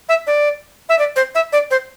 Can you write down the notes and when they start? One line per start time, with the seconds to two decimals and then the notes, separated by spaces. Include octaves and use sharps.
0.09 E5
0.27 D5
0.89 E5
0.99 D5
1.16 C5
1.35 E5
1.53 D5
1.71 C5